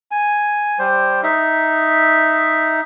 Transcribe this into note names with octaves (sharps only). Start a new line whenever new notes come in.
G#5
G3 C5
D#4 E5